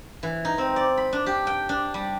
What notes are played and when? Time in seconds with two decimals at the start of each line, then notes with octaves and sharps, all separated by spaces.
0.23 E3
0.45 D#4
0.58 C4
0.76 D5
0.97 B5
1.13 D4
1.26 G4
1.47 G5
1.69 D4
1.94 G3